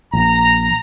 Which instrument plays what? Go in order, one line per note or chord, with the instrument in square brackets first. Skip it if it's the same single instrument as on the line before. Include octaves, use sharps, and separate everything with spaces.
[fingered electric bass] A#1 [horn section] A#5